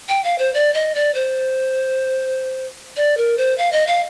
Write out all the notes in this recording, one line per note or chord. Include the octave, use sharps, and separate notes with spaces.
G5
F5
C5
D5
D#5
D5
C5
D5
A#4
C5
F5
D#5
F5